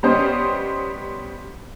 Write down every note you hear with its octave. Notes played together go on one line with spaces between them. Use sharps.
G3 B3 C#4 G4 C5 D#5